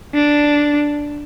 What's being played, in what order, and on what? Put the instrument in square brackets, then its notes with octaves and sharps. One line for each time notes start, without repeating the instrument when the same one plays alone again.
[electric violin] D4